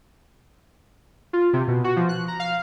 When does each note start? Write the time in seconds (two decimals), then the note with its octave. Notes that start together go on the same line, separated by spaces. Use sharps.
1.33 F4
1.53 C3
1.68 B2
1.84 F#4
1.96 F3
2.09 F#6
2.28 A#5
2.40 F5